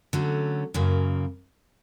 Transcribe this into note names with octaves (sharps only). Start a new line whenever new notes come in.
D3 F#3 A3 C#4
F#2 C#3 F#3 A#3